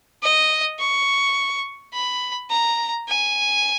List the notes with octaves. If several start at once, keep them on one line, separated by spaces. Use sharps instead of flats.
D#5
C#6
B5
A#5
G#5